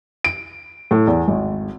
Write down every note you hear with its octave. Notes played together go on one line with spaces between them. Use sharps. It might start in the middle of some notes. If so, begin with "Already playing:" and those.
D7
A2
E2
G#1